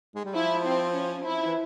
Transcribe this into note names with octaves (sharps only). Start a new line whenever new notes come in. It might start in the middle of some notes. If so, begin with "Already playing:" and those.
G#3
G3
F3 E4
C4
C#4
E4
E3